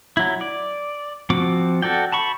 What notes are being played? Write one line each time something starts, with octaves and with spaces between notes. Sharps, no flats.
F#3 E4
D5
F3 C4 F#4 D6
F#4 A4 D5 G5
A5 B5 C#6